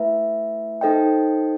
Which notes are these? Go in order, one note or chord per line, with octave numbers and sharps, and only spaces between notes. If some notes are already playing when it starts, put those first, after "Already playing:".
Already playing: A3 E4 B4 E5
D#4 A4 C5 D#5 G5